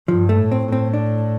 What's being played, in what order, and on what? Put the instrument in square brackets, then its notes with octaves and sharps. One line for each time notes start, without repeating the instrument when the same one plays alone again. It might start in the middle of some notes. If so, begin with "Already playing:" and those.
[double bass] G2 [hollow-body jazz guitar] F3
[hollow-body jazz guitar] A3
[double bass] A2
[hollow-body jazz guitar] C4
[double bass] A2
[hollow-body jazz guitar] C4
D4